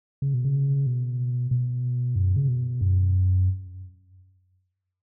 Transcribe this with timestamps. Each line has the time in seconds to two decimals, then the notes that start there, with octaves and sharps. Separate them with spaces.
0.22 C#3
0.34 B2
0.45 C#3
0.87 B2
1.51 B2
2.16 F#2
2.36 C#3
2.48 B2
2.81 F#2